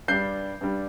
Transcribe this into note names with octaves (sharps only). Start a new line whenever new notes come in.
G2 G3 D4 G6 C7
G2 G3 D4